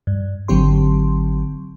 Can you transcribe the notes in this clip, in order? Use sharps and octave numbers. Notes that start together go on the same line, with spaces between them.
G2
G#1 D3 F#3 C4 G4 C6